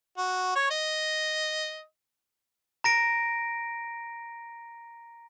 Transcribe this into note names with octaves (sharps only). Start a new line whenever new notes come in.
F#4
C#5
D#5
A#5 A#6 D7